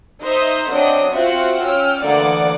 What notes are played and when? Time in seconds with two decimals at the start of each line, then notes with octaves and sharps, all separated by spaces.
0.22 D#4 C5 D#5 E5
0.71 F#3 C4 D4 D#5
1.14 C4 F4 F#4 E5 F#5
1.63 C#4 G5 E6 F6
2.03 D2 E3 A#3 D5 F#5